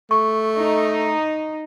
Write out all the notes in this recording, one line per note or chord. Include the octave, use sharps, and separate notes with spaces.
A3 C#6
D#4